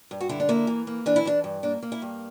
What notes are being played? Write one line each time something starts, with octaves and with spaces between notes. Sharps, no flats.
G2
F#4
D3 E4
D4
A#3 E4
E3
A#3
E3 D4
E4
E3 D4
G2
A#3 D4
A#3
E4
G2